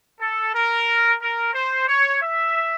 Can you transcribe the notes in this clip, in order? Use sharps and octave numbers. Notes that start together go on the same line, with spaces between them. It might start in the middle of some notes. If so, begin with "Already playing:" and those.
A4
A#4
A#4
C5
C#5
E5